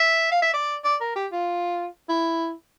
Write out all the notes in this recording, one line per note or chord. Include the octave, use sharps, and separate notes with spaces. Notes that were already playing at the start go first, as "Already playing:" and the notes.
Already playing: E5
F5
E5
D5
D5
A#4
G4
F4
E4